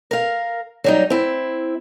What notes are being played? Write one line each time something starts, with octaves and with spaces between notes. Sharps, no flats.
A#4 F5
F#3 G3 D#4
C4 E4